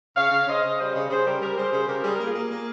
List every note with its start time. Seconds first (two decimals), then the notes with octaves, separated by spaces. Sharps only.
0.16 C#3 C#5 F5
0.31 C#3
0.47 C#3 C5 D#5
0.62 C#3
0.79 G3 C5 D#5
0.95 C#3
1.09 C#3 G#4 C5
1.25 G3 G4 A#4
1.41 G3 G4 A#4
1.57 G3 G#4 C5
1.72 C#3 G#4 C5
1.88 C#3 G4 A#4
2.03 G3 G#4
2.15 A#4
2.20 A#3
2.25 F4 G#4
2.35 A#3
2.51 A#3